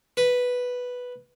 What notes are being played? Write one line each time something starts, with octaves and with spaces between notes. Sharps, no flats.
B4